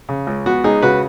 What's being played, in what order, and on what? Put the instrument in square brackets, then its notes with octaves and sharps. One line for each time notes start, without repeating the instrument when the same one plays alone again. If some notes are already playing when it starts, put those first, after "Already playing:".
[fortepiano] C#3
C#2
B3 F#4
C#2 D#4 G#4
C#3 F#4 B4